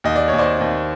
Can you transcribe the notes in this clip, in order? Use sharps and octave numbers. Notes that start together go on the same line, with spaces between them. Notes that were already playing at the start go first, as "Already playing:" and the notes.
D#2 D#5
D5
C#5
D#2
C5 D5
D#2